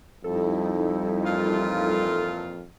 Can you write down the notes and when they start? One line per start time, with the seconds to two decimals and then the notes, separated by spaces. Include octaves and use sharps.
0.24 F2 G3 D#4 E4 A4
1.25 A#2 E3 F4